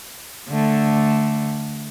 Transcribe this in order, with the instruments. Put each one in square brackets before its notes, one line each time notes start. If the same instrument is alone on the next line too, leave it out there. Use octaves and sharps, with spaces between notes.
[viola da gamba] D3 A3